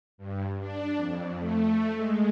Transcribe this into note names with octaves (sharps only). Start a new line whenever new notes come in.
G2
D4
F2
A3
G#3